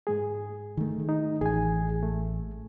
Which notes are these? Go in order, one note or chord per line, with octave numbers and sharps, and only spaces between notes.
G#2 G#3 G#4
D#3 A3
D#4
A1 G#4 G#5
A3